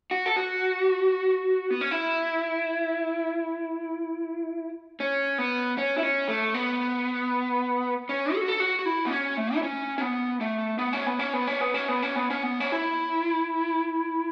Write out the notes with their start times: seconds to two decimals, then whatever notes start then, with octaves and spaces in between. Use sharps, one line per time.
0.11 F#4
0.26 A4
0.36 F#4
1.71 B3
1.81 C#4
1.91 E4
5.00 C#4
5.38 B3
5.78 C#4
5.98 E4
6.03 C#4
6.28 A3
6.54 B3
8.09 C#4
8.35 A4
8.41 F#4
8.48 A4
8.60 F#4
8.79 F#4
8.86 E4
9.06 B3
9.11 C#4
9.37 A3
9.55 E4
9.63 C#4
9.98 C#4
10.01 B3
10.41 A3
10.79 B3
10.93 C#4
11.06 B3
11.19 C#4
11.33 B3
11.47 C#4
11.61 B3
11.74 C#4
11.88 B3
12.03 C#4
12.16 B3
12.30 C#4
12.43 B3
12.60 C#4
12.72 E4